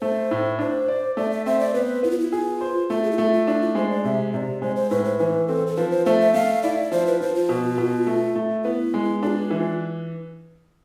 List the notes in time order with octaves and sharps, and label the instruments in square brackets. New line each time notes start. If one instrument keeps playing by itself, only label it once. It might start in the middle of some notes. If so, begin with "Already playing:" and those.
[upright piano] A3 [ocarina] C5
[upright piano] A2
[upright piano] D4 [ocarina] C5
[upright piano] D5
[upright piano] A3 [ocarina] D5
[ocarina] E5
[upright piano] C4 [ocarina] E5
[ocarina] D5
[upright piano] B3 [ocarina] B4
[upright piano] B3 [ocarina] E4
[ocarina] F4
E4
[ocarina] F4 [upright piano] G#4
[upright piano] C5
[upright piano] A3 [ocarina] F4
[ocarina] G#4
E4
[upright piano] A3 [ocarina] F4
[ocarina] F4
[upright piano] D4 [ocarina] E4
[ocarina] F4
[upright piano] G#3 [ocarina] C5
[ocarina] D5
[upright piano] C3 [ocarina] E5
[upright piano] C3 [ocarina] D5 E5
[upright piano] G#3 [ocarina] C5
[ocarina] C5
[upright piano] A2 [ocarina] B4
[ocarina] C5
[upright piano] E3 [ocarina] B4
[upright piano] C4 [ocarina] A4
[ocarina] A4
[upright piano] F3 [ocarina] B4
[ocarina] C5
[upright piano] A3 [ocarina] C5
[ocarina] E5
[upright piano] A3 [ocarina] F5
[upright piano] E4 [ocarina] D5
[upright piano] F3 [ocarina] C5
[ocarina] B4
[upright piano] F3 [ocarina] C5
[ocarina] F4
[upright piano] B2
B2
A3
A3
[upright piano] B3 [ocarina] E4
[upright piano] G#3
[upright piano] D4 [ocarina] F4 G#4
[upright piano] E3